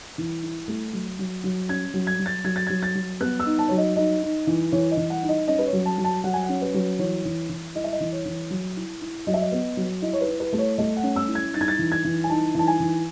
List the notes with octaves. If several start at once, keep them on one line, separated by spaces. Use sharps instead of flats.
E3
E4
A3
F#3
F#3
F#3
C#4 G#6
F#3
G#6
F#3
A6
F#3 G#6
A6
F#3 G#6
A6
F#3
B3 F#6
E6
D#4
A5
F#3 C#5
D#5
D#4 D#5
D#4
E3
E3 C#5
D#5
E3
F#5
D#4
D#5
C#4 D#5
B4
C#5
F#3
A5
F#3
A5
F#3 F#5
G#5
F#5
C#4
B4
F#3
E3 C#5
E3
E3
E4 D#5
E5
D#5
E3
C#5
E3
F#3
E4
E4
F#3 D#5
E5
D#5
B3
F#3
E4 D#5
C#5
B4
E4
B4
A3
C#5
A3 D#5
F#5
C#4
E6
E4
G#6
D#4 A6
G#6
A6
E3
G#6
E3
G#5
D#4 A5
E3 A5
G#5
E3